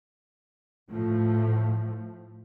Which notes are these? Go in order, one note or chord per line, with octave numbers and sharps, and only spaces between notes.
A2 F3 A3